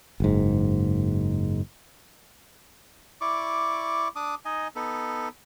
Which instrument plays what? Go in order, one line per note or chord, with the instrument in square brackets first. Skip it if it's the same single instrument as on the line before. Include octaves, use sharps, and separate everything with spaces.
[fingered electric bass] F#1 G#2
[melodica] E4 D5 C#6 D6
D4 D6 D#6
D#4 D#5 G#5
B3 D#4 A4